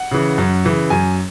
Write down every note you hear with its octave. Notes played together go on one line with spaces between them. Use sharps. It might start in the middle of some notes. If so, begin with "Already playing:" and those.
Already playing: F#5
C#3 E3
F#2
C#3 E3
F#2 G#5